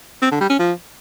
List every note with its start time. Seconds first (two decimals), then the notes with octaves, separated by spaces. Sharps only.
0.22 C4
0.31 D3
0.40 G3
0.50 C#4
0.59 F3